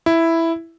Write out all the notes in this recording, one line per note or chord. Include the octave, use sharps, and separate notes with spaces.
E4